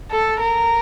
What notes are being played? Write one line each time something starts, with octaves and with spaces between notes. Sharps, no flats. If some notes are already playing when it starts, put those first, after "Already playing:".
A4
A#4